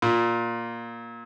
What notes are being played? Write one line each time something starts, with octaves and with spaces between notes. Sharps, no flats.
A#2